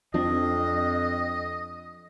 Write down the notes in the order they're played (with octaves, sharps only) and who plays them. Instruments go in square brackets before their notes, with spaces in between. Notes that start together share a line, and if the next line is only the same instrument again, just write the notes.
[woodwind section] F2 [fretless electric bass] F3 C4 D4 [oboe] D#5